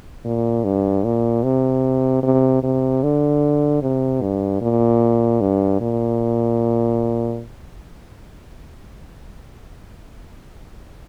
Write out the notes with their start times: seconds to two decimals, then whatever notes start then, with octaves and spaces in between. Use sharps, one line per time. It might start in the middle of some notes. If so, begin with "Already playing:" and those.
0.25 A#2
0.64 G2
1.04 A#2
1.44 C3
2.23 C3
2.63 C3
3.03 D3
3.82 C3
4.22 G2
4.61 A#2
5.41 G2
5.81 A#2